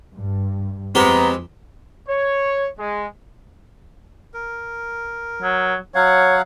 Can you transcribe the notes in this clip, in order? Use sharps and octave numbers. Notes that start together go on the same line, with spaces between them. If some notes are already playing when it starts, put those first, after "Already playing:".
G2
F2 G#3 B3 C4 G4 A#5
C#5
G#3
A#4
F#3
F#3 C#5 F5 F#5